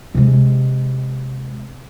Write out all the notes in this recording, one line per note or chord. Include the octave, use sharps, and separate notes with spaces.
C3 G#3